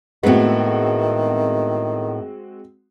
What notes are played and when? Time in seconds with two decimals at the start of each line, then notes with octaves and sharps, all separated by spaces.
0.23 A2 D#3 G#3 B3 C4 F#4